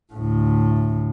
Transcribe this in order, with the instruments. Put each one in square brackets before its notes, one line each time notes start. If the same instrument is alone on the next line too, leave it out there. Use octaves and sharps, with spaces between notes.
[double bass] D2 A2